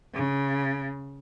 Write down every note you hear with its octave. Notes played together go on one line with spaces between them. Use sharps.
C#3